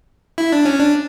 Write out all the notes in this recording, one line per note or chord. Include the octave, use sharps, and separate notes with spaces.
E4
D4
C#4
D4